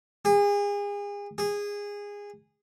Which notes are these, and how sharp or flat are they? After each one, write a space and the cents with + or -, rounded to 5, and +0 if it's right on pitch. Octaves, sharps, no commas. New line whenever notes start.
G#4 -35
G#4 -20